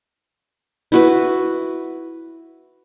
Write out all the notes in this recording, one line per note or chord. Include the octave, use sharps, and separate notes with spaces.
E4 F#4 B4